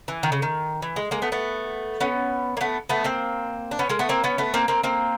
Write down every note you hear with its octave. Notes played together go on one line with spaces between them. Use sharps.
E3
D#3
C#3
D#3
E3
G#3
G#3 A#3
A3 B3
A3 B3
B3 C#4
A#3
A3 B3
A3 B3
A#3 C4
D4
B3 C#4
G#3 A#3
A3 B3
A#3 C4
B3 C#4
A3 B3
A#3 C4
A#3 C4
A#3 C4